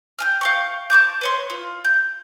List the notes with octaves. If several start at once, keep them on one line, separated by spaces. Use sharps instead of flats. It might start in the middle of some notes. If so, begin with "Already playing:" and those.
G5 G#5 F6
F5 G5 C#6
A5 C#6 D6 G6
B4 C#5 C6
F4
G6